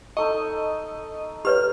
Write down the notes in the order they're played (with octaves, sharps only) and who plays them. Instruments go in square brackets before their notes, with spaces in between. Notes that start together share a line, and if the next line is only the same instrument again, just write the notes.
[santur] D#4 A4 C#6 [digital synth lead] D#5
[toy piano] G4 B4 C#5 [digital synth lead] F6